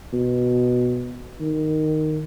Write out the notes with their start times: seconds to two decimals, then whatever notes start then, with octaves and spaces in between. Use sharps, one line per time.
0.13 B2
1.40 D#3